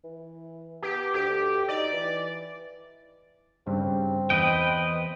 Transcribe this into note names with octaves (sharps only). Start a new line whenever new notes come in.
E3
B3 G4
D2 G4
D#4 D5
E3
G2 C#3 G3 C4
E2 B4 D#5 G5